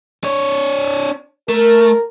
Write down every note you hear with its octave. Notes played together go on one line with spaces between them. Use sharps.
D4 C#5
A3 A#4